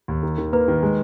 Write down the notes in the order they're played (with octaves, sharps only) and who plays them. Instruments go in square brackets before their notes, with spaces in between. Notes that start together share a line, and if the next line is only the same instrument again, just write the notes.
[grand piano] D#2
D#3
D#3
[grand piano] A#3 [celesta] B4
[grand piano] D#3
G#3